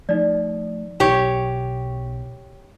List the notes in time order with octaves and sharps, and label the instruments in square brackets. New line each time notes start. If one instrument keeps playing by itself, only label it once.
[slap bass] F3 A3 [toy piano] D#4 D5
[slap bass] B1 B2 F#3 [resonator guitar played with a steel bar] G4 C#5